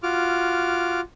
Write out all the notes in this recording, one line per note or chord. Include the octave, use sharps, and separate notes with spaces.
F4 F#4 D6 F6